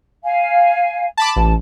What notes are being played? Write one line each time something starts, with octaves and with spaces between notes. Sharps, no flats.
F5 G#5
A5 B5 D6
A1 A5